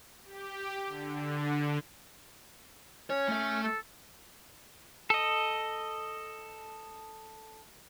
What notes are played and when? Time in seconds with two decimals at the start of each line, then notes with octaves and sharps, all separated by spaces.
0.25 G4
0.87 D3
3.10 C#4 C#5
3.28 A3 E5
3.63 A4
5.10 A4 D#5